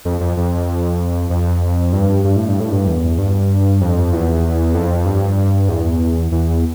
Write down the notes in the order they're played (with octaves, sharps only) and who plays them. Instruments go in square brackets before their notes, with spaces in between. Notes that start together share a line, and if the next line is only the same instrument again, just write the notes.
[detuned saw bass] F2
F2
F2
F2
G2
G2
A2
G2
A2
G2
E2
G2
F2
E2
F2
G2
E2
E2